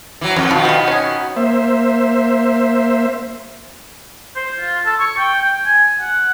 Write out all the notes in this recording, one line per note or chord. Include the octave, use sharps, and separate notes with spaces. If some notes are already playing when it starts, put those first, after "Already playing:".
E3 F#3
F2 C#4 F#4
B2 D#3 F3 B3
F3 G3
C#4 G#4
A#3 C5 E5
C5
F4
A4
C#6
G5
G5
G#5
F#5